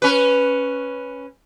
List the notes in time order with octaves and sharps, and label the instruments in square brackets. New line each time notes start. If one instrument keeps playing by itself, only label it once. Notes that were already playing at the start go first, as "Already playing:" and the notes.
[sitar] C#4 B4